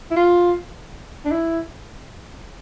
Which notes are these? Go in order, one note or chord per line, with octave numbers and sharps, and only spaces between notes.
E4
F4
D4
E4